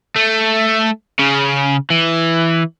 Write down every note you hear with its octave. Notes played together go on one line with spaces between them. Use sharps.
A3
C#3
E3